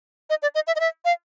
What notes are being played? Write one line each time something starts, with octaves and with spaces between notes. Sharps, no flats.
D#5
D5
D#5
E5
D#5
E5
F5